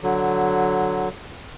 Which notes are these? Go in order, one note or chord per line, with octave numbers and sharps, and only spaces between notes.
D3 F#3